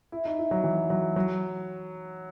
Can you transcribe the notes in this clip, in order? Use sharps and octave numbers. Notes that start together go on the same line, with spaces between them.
E4
D#4
E4
F#3
E3
F#3
F#3